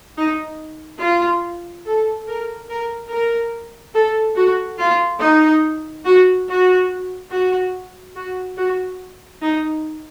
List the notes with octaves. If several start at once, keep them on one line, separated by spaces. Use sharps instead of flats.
D#4
F4
A4
A#4
A#4
A#4
A4
F#4
F4
D#4
F#4
F#4
F#4
F#4
F#4
D#4